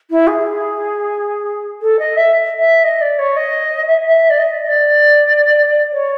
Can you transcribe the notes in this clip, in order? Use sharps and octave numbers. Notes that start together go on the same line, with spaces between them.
E4
G#4
A4
D#5
E5
E5
D#5
D5
C#5
D#5
E5
E5
D5
D#5
D#5
D5
C#5